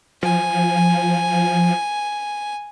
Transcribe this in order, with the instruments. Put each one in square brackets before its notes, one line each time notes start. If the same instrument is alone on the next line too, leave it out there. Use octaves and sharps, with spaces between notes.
[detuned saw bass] F3 [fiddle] G#5